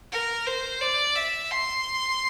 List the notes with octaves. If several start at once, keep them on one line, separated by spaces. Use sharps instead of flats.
A#4
C5
D5
E5
C6